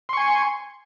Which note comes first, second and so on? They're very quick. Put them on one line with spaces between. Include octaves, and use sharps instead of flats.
C6 C#6 G#5